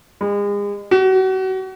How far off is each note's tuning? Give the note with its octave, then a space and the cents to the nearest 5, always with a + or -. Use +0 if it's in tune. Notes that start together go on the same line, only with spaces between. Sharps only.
G#3 -35
F#4 +35